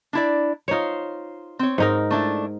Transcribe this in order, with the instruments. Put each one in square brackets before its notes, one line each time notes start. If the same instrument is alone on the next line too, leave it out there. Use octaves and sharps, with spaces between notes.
[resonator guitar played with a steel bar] D4 E4 D5
[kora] D#4 C#5 [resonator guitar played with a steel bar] F4 C5
[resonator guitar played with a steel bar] C4 C#5
[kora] G#2 D#4 A#4
[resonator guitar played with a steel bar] A3 D4 E4